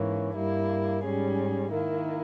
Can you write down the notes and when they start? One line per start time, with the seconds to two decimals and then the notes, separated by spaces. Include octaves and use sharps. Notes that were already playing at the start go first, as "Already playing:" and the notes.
Already playing: G#2 E3 A#3 C#4
0.36 G2 G3 A#3 E4
1.04 G#2 G3 C#4 G#4
1.72 D#3 A#3 E4